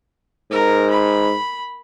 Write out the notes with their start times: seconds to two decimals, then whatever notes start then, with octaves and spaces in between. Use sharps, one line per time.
0.51 G#2 A#4
0.90 B5